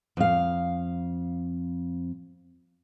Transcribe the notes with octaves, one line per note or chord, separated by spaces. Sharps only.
F2 F5